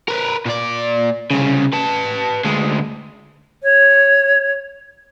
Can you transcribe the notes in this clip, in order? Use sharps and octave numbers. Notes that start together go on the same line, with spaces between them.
A#4 B4
A#2 D5
C2 C#3
B4 A5
D2 G#3
C#5